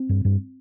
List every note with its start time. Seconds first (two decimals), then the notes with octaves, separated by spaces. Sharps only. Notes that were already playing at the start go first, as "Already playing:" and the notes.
Already playing: C4
0.09 G2
0.25 G2